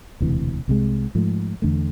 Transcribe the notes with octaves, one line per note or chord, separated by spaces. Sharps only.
E1 D2 C3 E3
C2 C3 G#3
G#2 F3 A3
E2 D3 A3